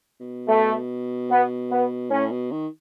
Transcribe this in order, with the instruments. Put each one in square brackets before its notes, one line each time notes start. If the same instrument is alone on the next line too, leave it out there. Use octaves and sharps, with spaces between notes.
[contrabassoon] B2
[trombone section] A3
B3
B3
[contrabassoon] A2 [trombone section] C#4
[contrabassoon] B2
D#3